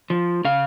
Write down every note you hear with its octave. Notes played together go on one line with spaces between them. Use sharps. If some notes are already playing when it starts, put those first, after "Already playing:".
F3
C#3 F5